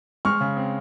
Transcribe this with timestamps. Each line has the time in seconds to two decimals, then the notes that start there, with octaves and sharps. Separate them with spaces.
0.25 G#3 C#6 F6
0.41 C#3
0.56 C4